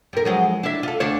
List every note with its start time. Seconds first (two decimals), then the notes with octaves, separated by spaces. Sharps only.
0.13 G2 A#4
0.25 F3 F#3 G#3
0.63 D4 E4 E5
0.83 F4 A4
1.00 D2 D4 C#5